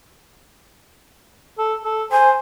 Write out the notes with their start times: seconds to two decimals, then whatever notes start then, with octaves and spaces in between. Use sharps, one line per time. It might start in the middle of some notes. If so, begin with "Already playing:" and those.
1.59 A4
1.84 A4
2.12 C5 G#5